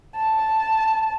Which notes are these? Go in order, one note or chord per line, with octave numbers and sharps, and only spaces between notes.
A5